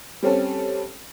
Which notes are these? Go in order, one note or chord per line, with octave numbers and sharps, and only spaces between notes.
G3 C4 C#4 A4